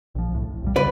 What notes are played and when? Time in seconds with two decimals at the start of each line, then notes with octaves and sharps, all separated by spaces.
0.15 A#1 F3
0.31 C2 A2
0.62 B1 F2 G3
0.76 C#3 B4 D5